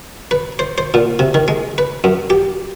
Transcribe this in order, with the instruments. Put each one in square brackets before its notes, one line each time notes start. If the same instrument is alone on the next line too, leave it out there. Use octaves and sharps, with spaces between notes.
[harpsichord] B4
C5
C5
A#2
C3
D#3
G#3
B4
F#2
G4